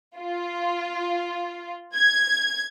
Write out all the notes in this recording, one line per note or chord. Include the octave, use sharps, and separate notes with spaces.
F4
G#6